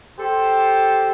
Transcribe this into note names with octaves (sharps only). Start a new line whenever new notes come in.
G4 A4 C5